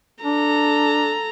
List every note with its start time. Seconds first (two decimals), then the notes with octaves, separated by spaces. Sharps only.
0.24 D4 A4 A#5